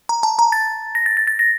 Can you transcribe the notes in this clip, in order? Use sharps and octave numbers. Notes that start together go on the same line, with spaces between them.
A#5
A5
A#5
A6
A#6
A6
A6
A6
A#6